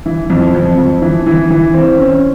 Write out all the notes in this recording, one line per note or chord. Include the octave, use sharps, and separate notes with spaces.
E3
F2
F2
F2
E3
E3
E3
C4
C#4